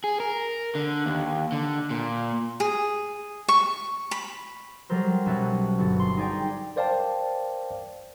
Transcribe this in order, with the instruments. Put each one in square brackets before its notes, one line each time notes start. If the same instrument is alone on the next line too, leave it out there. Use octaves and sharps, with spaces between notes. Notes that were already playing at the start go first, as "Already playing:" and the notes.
[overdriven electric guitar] G#4
A#4
D3
D#2
D3
A#2
[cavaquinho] G#4
C#6
B5
[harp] F#3 G3 A4 A#4 C5
B1 B2 C#4 E5 A5 F#6
G1 F#4 A4
C6
D#4 G#4 D5 G5 G#5
[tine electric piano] A#4 C5 D5 F5 G5 A5